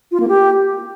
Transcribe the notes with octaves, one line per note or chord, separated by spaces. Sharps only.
F4
A#3
G4